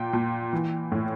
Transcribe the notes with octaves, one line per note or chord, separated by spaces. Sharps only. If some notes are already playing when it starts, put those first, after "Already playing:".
Already playing: A#2 G5
A#2
E3
A2